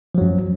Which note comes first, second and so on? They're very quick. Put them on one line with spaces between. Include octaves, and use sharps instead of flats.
F3 F#3 F#2